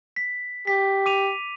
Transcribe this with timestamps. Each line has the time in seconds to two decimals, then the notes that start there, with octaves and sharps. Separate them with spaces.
0.16 B6
0.67 G4 B6
1.06 D6 D#7 F7